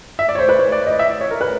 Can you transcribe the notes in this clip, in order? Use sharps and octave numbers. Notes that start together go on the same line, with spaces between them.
E5
D5
C#5
C5
B4
C#5
D5
D#5
E5
D5
C#5
A#4
B4